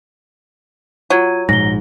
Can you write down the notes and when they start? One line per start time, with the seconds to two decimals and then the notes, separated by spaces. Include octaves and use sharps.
1.10 F#3 F4 G#6 D#7
1.49 A#1 G#2 A#6 G7